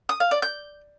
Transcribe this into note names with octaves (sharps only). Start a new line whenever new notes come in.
D#6
F5
D5
G6